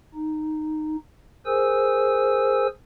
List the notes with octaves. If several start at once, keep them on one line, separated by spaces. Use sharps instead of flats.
D#4
G#4 A#4 C5 G#5 E6